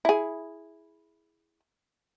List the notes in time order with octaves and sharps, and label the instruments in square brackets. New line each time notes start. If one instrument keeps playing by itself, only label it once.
[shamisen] E4 G#4